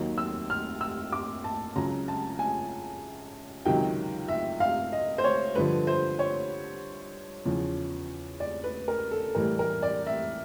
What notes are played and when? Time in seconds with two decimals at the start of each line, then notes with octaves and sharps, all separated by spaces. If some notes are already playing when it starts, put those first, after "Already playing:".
Already playing: D#2 D#3 F#3
0.18 E6
0.50 F6
0.81 E6
1.12 D6
1.44 A5
1.76 C#2 C#3 F#3 A#5
2.08 A5
2.39 G#5
3.65 C#2 C3 D#3 F#3 G5
4.28 E5
4.60 F5
4.92 D#5
5.18 C5
5.24 C#5
5.55 G2 D3 F3 B4
5.87 C5
6.19 C#5
7.45 E2 C#3 F3
8.40 D5
8.64 B4
8.88 A#4
9.11 A4
9.35 A2 E3 G3 A#4
9.59 A#4
9.82 D5
10.07 E5